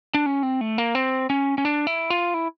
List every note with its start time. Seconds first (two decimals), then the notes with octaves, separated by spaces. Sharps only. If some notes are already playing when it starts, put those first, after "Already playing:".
0.14 D4
0.26 C#4
0.43 C4
0.61 A3
0.78 A#3
0.95 C4
1.30 C#4
1.58 C#4
1.65 D4
1.87 E4
2.10 F4
2.34 E4